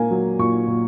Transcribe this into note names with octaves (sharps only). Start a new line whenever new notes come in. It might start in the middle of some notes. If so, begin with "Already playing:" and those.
Already playing: A#2 A#3 G#5
F#3
A#2 C#6
A#2